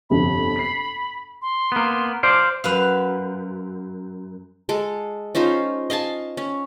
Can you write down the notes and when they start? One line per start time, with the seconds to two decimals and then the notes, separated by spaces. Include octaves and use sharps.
0.10 G1 F2 C3 B5
0.56 B6 C7
1.42 C6
1.72 A#3 B3
2.23 C5 D5 F5 D6
2.64 F#2 B4 F5
4.69 G#3 A4
5.35 C#4 D#4 F4 C5
5.90 D#5 F5 G#5 A5
6.37 C#4